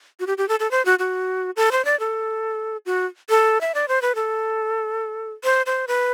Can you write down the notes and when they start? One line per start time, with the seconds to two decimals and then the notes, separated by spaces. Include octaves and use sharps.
0.20 F#4
0.27 G4
0.38 G4
0.49 A4
0.60 A4
0.71 C5
0.85 F#4
0.99 F#4
1.56 A4
1.72 C5
1.85 D5
2.00 A4
2.86 F#4
3.29 A4
3.61 E5
3.75 D5
3.88 C5
4.02 B4
4.15 A4
5.44 C5
5.66 C5
5.88 B4